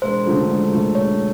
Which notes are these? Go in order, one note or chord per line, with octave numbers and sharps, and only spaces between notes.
E1 C5
D2 C#3 F3 A3
E1
D2 C#3 F3 A3
E1 C#5